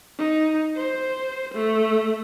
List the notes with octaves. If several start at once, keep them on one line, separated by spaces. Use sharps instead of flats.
D#4
C5
A3